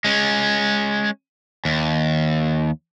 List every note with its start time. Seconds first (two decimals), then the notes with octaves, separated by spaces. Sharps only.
0.05 G#3 C#4
1.65 D#2